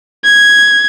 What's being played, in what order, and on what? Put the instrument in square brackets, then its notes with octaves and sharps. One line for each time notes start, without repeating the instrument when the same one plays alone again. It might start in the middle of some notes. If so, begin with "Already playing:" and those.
[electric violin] G#6